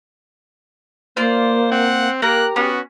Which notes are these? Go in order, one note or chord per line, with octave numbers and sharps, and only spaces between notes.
A#3 F4 C5 D5
C4 F#5
A#3 G4 A#4 A#5 F#6
B3 C#4 F#4